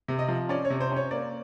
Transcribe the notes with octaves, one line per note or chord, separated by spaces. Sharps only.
C3
D#5
F3
C#4 D5
C#5
C3
C5
C#4 C#5
A#3 D5